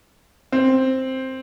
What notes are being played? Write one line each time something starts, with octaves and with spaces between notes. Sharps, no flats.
C4